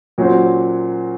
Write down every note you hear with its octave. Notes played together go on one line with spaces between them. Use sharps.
A#2 F#3 C#4 F#4 C5